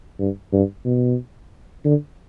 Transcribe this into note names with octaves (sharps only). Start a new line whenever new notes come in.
G2
G2
B2
D3